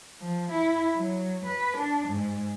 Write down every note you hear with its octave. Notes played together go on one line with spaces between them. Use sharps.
F3
E4
F#3
B4
D4
G#2